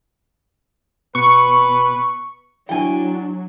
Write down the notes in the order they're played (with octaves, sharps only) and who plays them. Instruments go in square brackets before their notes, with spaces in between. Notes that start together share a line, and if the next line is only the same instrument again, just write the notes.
[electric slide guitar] B2 [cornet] B4 [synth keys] C#6
[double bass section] F#3 [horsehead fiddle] D4 [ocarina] E4 [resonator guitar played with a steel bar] G5 G#5